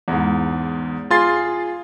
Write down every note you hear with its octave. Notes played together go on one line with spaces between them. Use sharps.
E2 G#2
F4 G#4 C6 A6